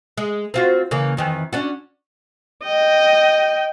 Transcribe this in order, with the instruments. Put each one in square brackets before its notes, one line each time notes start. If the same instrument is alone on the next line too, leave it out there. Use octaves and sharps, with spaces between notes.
[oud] G#3
C4 F4 F#4
C#3 E3 A#3
F2 D#3 E3
C#4 D4 F#4
[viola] D#5 G5